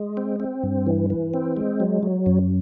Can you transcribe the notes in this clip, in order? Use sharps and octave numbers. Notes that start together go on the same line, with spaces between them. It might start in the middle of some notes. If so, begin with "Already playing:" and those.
Already playing: G#3
C4
C4
G2
E3
E3
C4
G#3
F#3
F#3
F#2